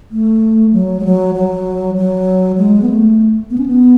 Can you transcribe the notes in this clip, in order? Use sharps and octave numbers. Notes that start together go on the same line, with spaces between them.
A3
F#3
G#3
F#3
F#3
F#3
G#3
B3
A3
B3
C#4
B3